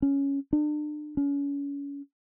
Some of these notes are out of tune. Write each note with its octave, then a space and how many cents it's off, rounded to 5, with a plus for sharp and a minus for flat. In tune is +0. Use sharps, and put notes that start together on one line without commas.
C#4 +5
D4 +35
C#4 +30